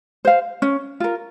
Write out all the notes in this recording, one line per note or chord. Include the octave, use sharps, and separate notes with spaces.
C5 F5
C#4
F4 A#4